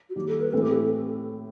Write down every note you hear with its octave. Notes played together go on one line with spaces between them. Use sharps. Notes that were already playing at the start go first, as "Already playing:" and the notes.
F#4
D#2 D#3 G3 G4
A4
B4
A2 E3 A3 C4 A4
G4
A4